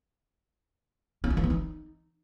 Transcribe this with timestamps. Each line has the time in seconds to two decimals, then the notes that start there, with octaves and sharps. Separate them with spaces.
1.24 C#4
1.30 F4
1.37 E3
1.43 C4
1.50 D#4